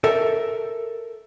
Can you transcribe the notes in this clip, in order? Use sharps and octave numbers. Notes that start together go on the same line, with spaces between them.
A4 A#4 E5